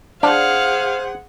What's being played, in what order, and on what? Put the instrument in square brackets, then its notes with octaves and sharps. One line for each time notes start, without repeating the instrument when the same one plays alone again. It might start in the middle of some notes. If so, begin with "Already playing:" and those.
[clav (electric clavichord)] D4 [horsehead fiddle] G#4 F#5 [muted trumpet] C5 [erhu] F5